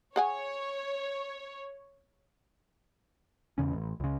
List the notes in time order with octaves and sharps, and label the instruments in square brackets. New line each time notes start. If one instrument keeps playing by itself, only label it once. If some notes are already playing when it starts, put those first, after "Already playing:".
[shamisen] G#4 F#5 G#5 [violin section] C#5
[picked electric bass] E2 C#3 C#4
A1
C#2 C#3